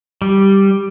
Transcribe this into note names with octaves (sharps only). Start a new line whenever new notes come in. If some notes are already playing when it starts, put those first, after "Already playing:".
G3